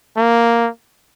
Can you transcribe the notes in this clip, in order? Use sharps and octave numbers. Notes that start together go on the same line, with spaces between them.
A#3